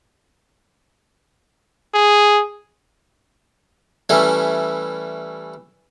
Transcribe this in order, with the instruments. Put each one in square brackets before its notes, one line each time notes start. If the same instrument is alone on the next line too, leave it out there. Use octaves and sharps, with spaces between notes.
[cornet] G#4
[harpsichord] E3 G3 A3 C#4 E4